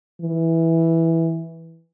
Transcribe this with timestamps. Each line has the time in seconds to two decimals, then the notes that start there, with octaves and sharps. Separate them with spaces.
0.21 E3